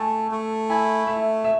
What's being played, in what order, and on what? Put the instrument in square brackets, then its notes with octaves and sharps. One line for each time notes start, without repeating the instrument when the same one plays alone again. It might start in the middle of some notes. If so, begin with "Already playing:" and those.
Already playing: [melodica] A3 [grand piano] G#5 A5
[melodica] A3
[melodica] E4 [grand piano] G#5
[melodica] A3 [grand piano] E5
[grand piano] E5